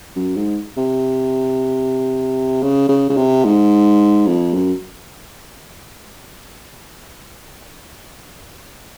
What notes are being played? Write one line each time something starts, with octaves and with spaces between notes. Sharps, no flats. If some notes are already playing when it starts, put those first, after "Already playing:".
F#2
G#2
C3
C#3
C#3
C#3
C3
G#2
F2
F#2